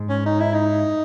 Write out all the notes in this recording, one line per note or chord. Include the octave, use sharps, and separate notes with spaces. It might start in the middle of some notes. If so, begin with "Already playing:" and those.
Already playing: G#2
C#4
D#4
E4
D#4